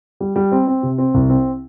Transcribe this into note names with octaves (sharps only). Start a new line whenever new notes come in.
G3
G3
C4
C4
C3
C4
C2
C4